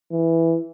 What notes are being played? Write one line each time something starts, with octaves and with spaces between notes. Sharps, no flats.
E3